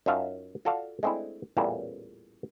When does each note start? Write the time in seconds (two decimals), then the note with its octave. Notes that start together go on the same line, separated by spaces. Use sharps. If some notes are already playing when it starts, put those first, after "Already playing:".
0.06 F#2 D#4 F4 E5 F5 A5
0.65 F4 F#4 A4 D5 F5
1.03 G#3 A3 C4 D4 E4
1.57 A1 E2 A#2 G3 C#4 A5